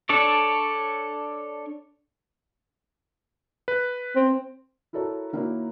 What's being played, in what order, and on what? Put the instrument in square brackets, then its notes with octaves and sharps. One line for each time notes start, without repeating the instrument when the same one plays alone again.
[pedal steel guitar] D4 A4 C#5 D5
[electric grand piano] B4
[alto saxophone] C4
[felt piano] E4 F#4 A4 A#4 C#5
D#3 A#3 E4 F#4 A#4 C#5